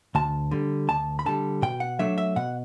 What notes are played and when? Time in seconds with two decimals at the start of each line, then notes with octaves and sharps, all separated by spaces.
0.15 D2 A5
0.51 D3 G3
0.89 D2 A5
1.19 B5
1.26 D3 G3 A5
1.62 B2 G5
1.80 F#5
1.99 F#3 A3 D4 E5
2.18 E5
2.36 B2 F#5